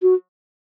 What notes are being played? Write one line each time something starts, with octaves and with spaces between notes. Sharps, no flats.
F#4